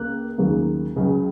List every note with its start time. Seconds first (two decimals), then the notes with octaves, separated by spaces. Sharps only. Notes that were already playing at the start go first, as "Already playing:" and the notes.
Already playing: C#2 C#3 A#3 F#6
0.38 D#2 C#3 F#3 A#3
0.96 C#2 C#3 F#3